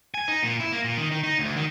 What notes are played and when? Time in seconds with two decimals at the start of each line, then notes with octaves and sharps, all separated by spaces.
0.14 G#5
0.28 D#4
0.43 A#2
0.60 E4
0.72 A#3
0.84 A#2
0.97 D#3
1.11 D#3
1.24 D#4
1.39 D2
1.56 D#3